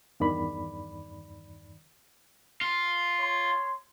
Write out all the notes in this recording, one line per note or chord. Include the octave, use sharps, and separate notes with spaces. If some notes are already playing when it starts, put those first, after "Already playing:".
E2 G2 D#3 D5 B5
F4
C#5 C6